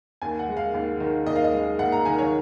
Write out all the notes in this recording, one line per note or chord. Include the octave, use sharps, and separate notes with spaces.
D#2 G#5
F#5
G#3
F5
D#2
D#3
D#2 D#5
F5
D#5
G#3
D#2 F#5
A#5
D#3 G#5
C#5